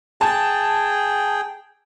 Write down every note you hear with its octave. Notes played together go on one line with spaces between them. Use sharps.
G#4 G5 A5